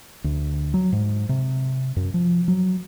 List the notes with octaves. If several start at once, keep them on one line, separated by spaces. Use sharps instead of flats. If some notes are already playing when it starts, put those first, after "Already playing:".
D2
F#3
G#2
C3
F#2
F3
F#3